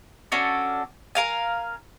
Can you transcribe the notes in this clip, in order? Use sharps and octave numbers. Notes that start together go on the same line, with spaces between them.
C#4 D4 F#4 A4
A#4 F5 G#5